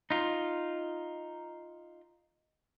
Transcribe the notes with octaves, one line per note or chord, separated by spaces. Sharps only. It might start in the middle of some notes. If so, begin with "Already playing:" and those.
D#4 F4